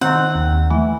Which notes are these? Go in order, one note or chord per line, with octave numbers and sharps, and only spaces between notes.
D#3 C4 F#5
D#2
E3 A3